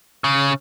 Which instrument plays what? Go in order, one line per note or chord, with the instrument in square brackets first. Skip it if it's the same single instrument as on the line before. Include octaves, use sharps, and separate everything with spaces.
[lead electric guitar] C#3